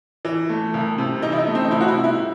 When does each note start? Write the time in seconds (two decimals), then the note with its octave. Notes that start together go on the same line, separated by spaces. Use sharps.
0.25 E3
0.49 A3
0.74 C2
0.98 C3
1.22 E3 D#4
1.32 E4
1.38 D#4
1.47 A3
1.55 C4
1.64 D#4
1.71 C2 E4
1.81 F#4
1.88 E4
1.96 C3
2.04 E4